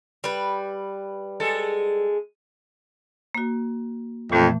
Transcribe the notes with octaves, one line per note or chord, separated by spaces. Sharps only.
G3 B4
G#3 A4
A#3 F#4
F2 A#2 E3 A3